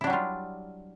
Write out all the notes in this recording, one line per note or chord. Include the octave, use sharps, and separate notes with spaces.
F#3 G3 D4 E4 F4